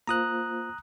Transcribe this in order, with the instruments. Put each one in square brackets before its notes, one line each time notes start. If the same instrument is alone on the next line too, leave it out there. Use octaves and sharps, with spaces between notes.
[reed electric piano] A#3 F4 C5 [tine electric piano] A#5 D#6 F#6